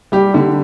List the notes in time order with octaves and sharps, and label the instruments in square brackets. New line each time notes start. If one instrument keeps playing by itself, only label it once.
[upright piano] G3 G4
D3